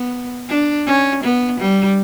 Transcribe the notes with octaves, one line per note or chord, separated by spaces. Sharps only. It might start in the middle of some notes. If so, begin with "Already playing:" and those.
Already playing: B3
D4
C#4
B3
G3